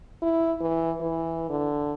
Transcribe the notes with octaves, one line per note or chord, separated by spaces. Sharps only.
E4
E3
E3
D3